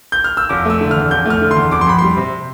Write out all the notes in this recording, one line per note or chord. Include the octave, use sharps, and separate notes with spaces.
G6
F6
E6
F1 D6
A3
E6
D3
F6
E2
F1 G6
A3 F6
D3
C6
E2
F2 D6
C6
F2 B5
G3 C6
C3